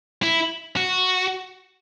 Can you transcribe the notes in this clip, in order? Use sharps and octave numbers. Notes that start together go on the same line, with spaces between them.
E4
F#4